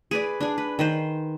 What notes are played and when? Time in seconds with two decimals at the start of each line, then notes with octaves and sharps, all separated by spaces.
0.11 G#4 B4 D5
0.41 D4 G#4
0.58 B4
0.79 D#3 B4 C5